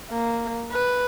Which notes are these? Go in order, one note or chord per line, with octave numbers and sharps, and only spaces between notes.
A#3
B4